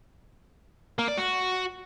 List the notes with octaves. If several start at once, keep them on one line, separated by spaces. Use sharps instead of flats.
A#3
D5
F#4